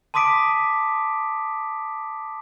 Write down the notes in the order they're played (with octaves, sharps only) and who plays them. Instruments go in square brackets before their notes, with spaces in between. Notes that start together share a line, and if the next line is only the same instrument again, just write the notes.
[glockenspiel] A5 C6 D6 D#6 B6 D7